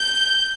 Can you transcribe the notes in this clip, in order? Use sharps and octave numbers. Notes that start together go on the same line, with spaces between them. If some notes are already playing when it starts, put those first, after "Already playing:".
Already playing: G6